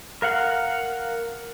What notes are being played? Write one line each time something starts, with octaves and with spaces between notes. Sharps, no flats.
A#4 F5 F#5